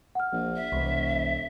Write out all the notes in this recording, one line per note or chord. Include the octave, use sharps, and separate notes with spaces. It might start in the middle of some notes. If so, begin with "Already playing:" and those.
F#5 F6
A#1
E5
E1 C2